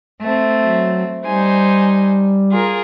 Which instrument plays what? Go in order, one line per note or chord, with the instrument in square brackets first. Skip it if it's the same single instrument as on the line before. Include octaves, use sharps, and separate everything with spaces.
[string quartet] A3 C4
[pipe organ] F#3
[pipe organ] G3 [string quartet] D#4 C5 G#5
[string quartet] F4 G#4 A#4